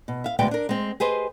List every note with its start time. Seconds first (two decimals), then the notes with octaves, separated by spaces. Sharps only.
0.08 B2
0.24 E5 F5
0.39 D2 B2 G#3 B4 D5 G5
0.51 D4 A#4
0.69 G#3 C4
1.00 G4 G#4 B4 C5 D#5